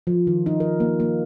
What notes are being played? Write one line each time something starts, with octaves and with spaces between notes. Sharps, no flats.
F3
D#3
D#4
A#4
A#3
A#3